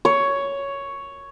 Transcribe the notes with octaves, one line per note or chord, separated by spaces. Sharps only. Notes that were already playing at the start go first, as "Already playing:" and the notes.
C#5